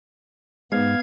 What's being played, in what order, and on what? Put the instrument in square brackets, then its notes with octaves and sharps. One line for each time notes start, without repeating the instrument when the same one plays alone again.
[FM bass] G#2 [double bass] B3 [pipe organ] F5 G#6